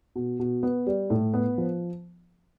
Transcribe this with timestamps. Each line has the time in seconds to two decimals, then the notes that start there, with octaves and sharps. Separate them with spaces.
0.16 B2
0.40 B2
0.63 B3
0.87 G3
1.10 A2
1.34 B3
1.58 F3